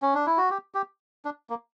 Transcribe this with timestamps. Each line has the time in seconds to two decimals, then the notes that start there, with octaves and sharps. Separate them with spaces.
0.02 C#4
0.14 D4
0.27 E4
0.38 F#4
0.50 G4
0.74 G4
1.25 D4
1.50 A#3